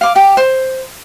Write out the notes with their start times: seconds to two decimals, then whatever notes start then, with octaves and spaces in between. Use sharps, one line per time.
0.01 F5 D6
0.15 G4 G5
0.37 C5